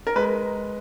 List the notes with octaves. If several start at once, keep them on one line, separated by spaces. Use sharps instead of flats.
A#4
G#3 B4